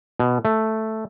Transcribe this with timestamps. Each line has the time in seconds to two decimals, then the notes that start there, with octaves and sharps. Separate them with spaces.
0.20 B2
0.45 A3